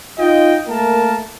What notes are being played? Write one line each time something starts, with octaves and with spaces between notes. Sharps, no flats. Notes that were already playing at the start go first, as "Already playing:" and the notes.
D#4 F4 D#5 G5
A3 A#3 A#4 A5